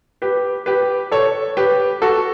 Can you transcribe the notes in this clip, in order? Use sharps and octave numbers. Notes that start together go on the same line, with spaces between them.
G4 B4
G4 B4
A4 C#5
G4 B4
F#4 A4